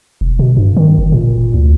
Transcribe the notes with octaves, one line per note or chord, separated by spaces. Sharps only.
E1
B2
G2
D#3
G1
A#2
D2